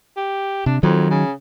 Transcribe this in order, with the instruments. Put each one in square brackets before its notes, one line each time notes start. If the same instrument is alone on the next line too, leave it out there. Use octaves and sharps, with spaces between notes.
[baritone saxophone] G4
[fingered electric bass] C3 [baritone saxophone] D4
[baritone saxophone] F2 [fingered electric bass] D#3 F#3
[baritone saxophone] C#3